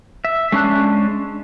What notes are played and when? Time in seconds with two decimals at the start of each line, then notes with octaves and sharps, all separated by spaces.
0.25 E5
0.52 G#3 C#4 D4 A5 F#6